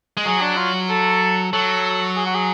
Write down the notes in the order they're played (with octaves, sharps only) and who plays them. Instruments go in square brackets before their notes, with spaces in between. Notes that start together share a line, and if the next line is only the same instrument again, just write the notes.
[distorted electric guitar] G#3
[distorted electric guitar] F#3 [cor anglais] G#4
[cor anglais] D4
F4
A4
[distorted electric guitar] F#3 [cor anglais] A4
[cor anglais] G#4
F#4
G#4